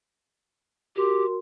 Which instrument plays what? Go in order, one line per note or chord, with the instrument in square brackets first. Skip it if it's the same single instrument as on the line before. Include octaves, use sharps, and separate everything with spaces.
[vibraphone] F#4 A#4 C6 [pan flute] G4